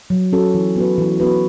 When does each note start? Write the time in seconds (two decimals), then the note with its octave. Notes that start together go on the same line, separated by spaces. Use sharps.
0.10 F#3
0.33 C#4 F#4 A4
0.54 E3
0.76 B3 F#4 B4
0.98 E3
1.20 B3 F#4 B4